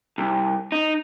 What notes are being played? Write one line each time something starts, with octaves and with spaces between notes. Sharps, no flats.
C2
D#4